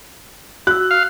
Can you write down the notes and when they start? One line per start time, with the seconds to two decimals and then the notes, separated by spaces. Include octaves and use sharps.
0.67 F#4 E6 F#6
0.91 F5